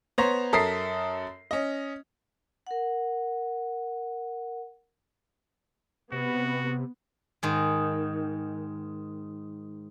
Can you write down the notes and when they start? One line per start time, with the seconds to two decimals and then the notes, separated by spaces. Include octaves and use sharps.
0.18 B3 C5 C#5 A#5 A#6
0.53 F#2 A4 A#4 D#6 B6 C7
1.51 C#4 D#5
2.67 A#4 F#5
6.12 C3 B3 F#4
7.43 G#2 D#3